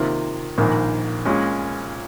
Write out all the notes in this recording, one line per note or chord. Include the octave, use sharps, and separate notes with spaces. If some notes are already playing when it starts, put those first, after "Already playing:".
Already playing: C3 D#3 A#3 F4
A#1 G#2 D#3 A#3
A#2 G#3 C#4